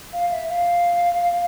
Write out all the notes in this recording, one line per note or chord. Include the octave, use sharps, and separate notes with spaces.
F5
E5
F5